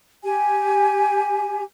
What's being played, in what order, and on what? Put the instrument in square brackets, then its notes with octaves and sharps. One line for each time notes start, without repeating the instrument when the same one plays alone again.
[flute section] G4 G#5